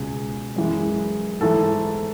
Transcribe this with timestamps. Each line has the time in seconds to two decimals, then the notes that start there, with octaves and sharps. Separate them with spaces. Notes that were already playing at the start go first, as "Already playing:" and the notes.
Already playing: C#2 B2 G#3 G#4
0.56 F#2 E3 G#3
1.41 G#2 E3 A3 A4